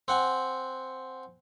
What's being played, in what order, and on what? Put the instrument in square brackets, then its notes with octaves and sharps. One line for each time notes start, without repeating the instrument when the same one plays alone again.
[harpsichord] C4 F#5 G#5